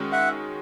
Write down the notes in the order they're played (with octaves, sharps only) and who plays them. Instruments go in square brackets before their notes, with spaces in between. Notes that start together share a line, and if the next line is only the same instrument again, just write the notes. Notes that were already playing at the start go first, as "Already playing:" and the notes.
Already playing: [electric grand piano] D#3 G#3 C#4 F#4
[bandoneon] E5 F#5